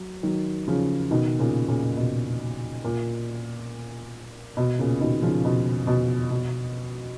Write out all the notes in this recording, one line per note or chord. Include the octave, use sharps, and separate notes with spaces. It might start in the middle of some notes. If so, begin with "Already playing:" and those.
Already playing: F#3
D#3 F#3
C#3 F3
B2 D#3
A#2 C#3
A#2 C#3
B2
A#2
B2
A#2 C#3
B2 D#3
C#3 F3
B2
B2
B2